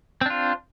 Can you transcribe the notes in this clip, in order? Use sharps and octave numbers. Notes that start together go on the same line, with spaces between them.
C4 D4 F4